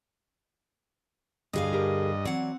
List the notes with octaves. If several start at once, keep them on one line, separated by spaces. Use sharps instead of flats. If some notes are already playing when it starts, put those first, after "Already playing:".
D2 G2 G#4 D#5 F5
G4 A#4
E3 F#3 C4 D5 F#5